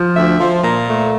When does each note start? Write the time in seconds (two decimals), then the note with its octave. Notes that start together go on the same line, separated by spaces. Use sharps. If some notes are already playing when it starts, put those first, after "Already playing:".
Already playing: F3
0.15 D2 E5
0.39 F3
0.63 A#2
0.87 A3